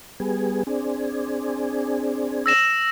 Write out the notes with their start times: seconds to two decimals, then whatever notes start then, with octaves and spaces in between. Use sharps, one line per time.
0.20 G3 B3 G#4
0.67 C4 D4 G#4
2.46 E6 A#6 E7